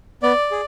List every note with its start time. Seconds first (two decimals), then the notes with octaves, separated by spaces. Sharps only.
0.23 B3 D5
0.51 G#4